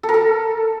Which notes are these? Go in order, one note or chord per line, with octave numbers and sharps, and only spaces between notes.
A4
A#4
A4